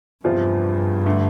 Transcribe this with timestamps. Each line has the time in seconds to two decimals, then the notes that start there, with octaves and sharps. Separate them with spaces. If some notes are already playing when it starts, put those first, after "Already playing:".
0.24 E2 G2 C3 F3 C4 F4
1.06 D3 A3